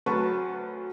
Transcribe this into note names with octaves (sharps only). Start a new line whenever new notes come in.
D2 F#3 B4 A5 C#6